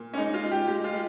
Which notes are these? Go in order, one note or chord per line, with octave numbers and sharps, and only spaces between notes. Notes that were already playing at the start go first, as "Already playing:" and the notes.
Already playing: A#2
C#4
G#3 D#4
F4
G#3
G4
G#3 G4
F4
G#3